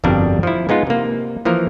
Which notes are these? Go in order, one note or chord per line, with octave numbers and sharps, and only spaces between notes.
G1 F2 B2 G3 D4 A#4
F3 E4
G#3 B3 D#4 F4
C3 A#3
E3 F3 A#3 A#4